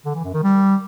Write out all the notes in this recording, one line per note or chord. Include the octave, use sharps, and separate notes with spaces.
D3
E3
F#2
D#3
G3